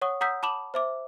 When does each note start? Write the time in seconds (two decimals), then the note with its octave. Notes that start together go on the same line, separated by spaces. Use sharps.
0.02 C#5 F#5 C#6 D#6
0.21 F#5 A#5 D#6 E6 G6 B6
0.43 A5 B5 D6 E7 F#7
0.74 C5 E5 D6